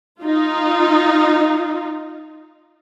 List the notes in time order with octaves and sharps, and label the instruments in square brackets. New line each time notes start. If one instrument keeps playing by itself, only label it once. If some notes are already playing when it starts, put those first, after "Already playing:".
[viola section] D#4 F4